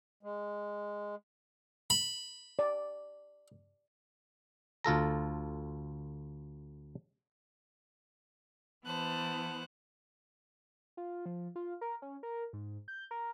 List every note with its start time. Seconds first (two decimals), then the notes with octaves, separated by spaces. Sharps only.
0.23 G#3
1.90 B5
2.59 D5
4.84 D2 F4 A4 A#5
8.86 E3 B3 C5 A5 F#6
10.97 F4
11.26 F3
11.56 F4
11.81 A#4
12.02 C#4
12.23 A#4
12.53 G#2
12.88 G6
13.11 A#4